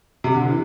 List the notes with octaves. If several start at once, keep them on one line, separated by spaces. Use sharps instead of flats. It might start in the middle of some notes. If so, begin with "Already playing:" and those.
C3
D3
E3